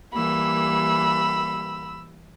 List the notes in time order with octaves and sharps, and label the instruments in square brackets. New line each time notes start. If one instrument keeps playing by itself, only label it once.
[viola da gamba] E3 G3 A#3 [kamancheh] B5 E6